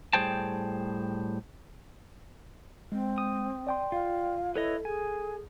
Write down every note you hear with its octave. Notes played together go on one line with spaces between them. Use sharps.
A2 G3 G#4 C5 G5 A5
G#3 C4
D#6
D5 G5 C6
F4 F5
E4 A4 B4 C#5 D#5
G#4 G#5